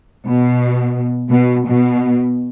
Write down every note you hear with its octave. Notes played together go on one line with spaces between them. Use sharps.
B2
B2
B2